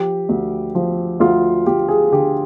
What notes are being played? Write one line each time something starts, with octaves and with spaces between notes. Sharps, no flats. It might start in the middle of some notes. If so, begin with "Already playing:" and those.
Already playing: F3 G4
D2
F3
D2 F4
D2 G4
G#4
D3 G4